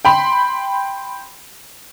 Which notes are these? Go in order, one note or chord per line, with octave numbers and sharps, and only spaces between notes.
G5 B5 C6